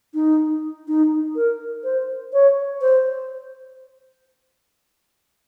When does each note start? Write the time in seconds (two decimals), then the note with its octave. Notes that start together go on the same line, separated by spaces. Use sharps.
0.14 D#4
0.88 D#4
1.36 A#4
1.84 C5
2.33 C#5
2.81 C5